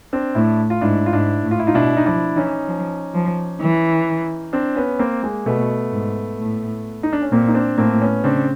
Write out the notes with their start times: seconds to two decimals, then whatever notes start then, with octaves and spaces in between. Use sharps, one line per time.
0.13 C4 D4
0.35 A2 D4 E4
0.70 F4
0.81 G#2 D4 E4
1.06 F4
1.12 G#2 D4 E4
1.44 A2
1.51 F4
1.59 E4
1.67 D#4 F4
1.74 B2 D4 E4
1.97 D#4
2.06 F3 D4 E4
2.36 E3 C#4 D#4
2.67 F3
3.14 F3
3.61 E3
4.53 C4 D4
4.76 B3 C#4
4.99 A#3 C4
5.23 G#3 A#3
5.46 B2 A3 B3
5.92 G#2
6.39 A2
7.03 D#4
7.13 D4
7.22 C#4
7.32 A#2 A#3 C4
7.48 D#4
7.54 C4 D4
7.78 A2 A#3 C4
8.02 B3 C#4
8.24 C#3 C4 D4